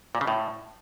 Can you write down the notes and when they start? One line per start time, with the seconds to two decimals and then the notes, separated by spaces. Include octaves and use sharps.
0.15 A#2
0.21 C#3
0.27 A2